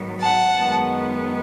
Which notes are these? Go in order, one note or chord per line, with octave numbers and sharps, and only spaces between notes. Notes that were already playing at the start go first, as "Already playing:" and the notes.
Already playing: G#2 D#3 F#3 B3
F#5 A5
F#2 D#3 G#3 B3